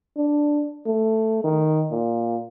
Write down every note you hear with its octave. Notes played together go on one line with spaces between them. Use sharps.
D4
A3
D#3
A#2